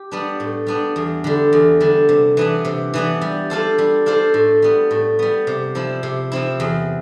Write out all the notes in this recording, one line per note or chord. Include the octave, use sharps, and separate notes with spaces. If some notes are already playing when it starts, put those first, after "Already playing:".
Already playing: G4
G3 B3 D4
A2
G3 B3 D4
E2
D3 G3
E2
D3 G3
C3
E3 B3 D4
C3
E3 B3 D4
G3
D4 F4 A4 C5
G3
D4 F4 A4 C5
A2
G3 B3
A2
G3 B3
C3
F3 C4 E4
C3
F3 C4 E4
E2